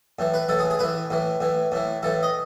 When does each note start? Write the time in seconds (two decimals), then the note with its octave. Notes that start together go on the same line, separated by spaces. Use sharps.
0.19 A2 E3
0.34 B4
0.49 A2 E3 A4
0.59 G#4
0.70 G#4
0.79 A2 E3 B4
1.10 A2 E3
1.41 A2 E3
1.72 A2 E3
2.03 A2 E3 A4
2.23 D#5